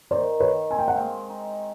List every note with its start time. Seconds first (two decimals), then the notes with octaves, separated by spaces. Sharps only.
0.11 D#3 C5 D5
0.40 D#3 B4 C#5
0.70 C4 G#5
0.79 G5
0.88 F#5
0.96 G#3 F5 G5
1.30 D#4